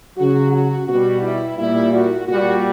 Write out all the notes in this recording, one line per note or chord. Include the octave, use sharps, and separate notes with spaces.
C#3 F#3 F#4
F#4
B2 G3 F#4
E4
A#2 G3 E4
F#4
A#2 G3 F#4